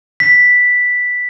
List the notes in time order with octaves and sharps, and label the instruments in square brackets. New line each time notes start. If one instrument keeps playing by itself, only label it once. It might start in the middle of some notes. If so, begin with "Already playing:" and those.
[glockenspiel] B6